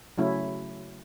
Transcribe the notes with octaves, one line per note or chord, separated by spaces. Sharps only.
C#3 F#3 A3 C#4 E4